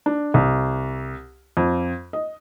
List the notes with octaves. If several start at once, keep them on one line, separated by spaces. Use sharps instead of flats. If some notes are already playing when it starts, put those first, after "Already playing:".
D4
C2
F2
D#5